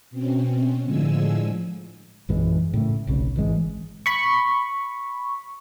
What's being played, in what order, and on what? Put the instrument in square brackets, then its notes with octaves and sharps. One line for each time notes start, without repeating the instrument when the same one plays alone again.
[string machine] B2 C4 C#4
A2 D3 F3 G#3 G#5 E6
[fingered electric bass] A#1 F#2 E3 G#3
A2 C#3 A3
F1 B1 C#3
G#1 E3 G#3
[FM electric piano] B5 C#6